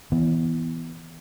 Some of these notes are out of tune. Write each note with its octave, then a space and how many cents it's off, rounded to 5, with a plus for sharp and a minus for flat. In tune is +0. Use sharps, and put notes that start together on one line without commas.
E3 -15 B3 +0